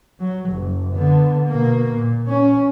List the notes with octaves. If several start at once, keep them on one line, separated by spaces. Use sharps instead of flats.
F#3
F#1
D3 B3
B2 A#3
A#2
C#4